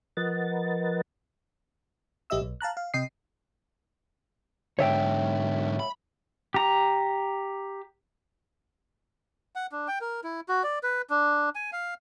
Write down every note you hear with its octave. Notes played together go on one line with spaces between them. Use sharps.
F3 A#4 B4 D#5 F#5 A6
A1 G4 D#5 E5 E6
B1
F5 A5 A#5 F#6
F5
C3 D#5 G5 D#6 C7
G#2 D3 C#5 E5 G5
B5
G4 A#5
F#5
D4
G5
A#4
E4
F#4
D5
B4
D4
G#5
F5